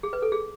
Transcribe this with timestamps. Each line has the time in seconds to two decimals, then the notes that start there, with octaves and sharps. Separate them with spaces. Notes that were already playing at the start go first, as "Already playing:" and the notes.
0.03 G#4
0.13 B4
0.22 A4
0.32 G#4